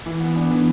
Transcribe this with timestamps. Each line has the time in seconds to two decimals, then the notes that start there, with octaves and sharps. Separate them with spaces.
0.06 E3
0.21 B3
0.36 D4
0.51 E3